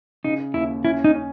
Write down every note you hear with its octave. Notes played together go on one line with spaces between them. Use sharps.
C#3 D#4
D#2 E4
C#4 E4
D#4
C#4